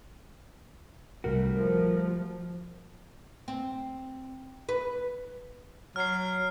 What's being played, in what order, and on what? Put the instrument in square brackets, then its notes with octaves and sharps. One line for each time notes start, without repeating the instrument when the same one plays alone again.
[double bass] C2 [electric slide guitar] G3 A3 F#4 [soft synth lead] A#4
[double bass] F3
[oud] C4
B4
[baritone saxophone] F#3 [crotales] F6 C7